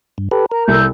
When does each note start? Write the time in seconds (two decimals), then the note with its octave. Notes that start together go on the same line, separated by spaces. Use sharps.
0.18 G2
0.31 G4 A4 B4
0.51 A#4 A#5
0.68 C2 A4 G6